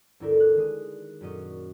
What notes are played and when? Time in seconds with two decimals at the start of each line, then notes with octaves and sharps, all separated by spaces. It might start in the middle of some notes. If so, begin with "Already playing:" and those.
0.20 G1 D2 E4 A4 A#4 D5
0.40 F#6
0.55 D#3 G#3 D#6
1.21 F#2 A#2 F#3 C#4 D#5